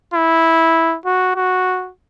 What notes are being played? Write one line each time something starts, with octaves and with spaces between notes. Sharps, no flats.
E4
F#4
F#4